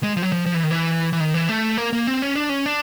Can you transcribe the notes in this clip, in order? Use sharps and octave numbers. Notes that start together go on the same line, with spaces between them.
G#3
F3
F#3
F3
F3
E3
D#3
E3
E3
D#3
E3
A3
A#3
A#3
C4
C#4
D4
C#4
D4